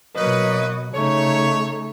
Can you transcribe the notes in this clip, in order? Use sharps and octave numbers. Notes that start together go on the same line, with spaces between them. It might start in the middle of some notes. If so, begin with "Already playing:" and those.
B2 F#3 A#3 B4 C#5 D#5
C#3 A3 D#4 C#5